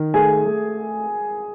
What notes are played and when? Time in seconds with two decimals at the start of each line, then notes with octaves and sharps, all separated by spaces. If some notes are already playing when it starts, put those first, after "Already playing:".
Already playing: D#3
0.14 A3 G#4 G#5
0.45 A3